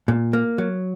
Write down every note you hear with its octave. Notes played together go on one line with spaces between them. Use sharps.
A#2
A#3
F#3